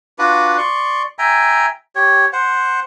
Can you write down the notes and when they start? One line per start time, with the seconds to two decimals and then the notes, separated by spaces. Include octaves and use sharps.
0.19 D4 F4 F#4 B4
0.58 D5 C6 C#6
1.19 E5 G5 G#5 A#5
1.95 G4 C#5
2.33 C5 F#5